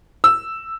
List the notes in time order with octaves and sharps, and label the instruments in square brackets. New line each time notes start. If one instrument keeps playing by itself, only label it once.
[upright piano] E6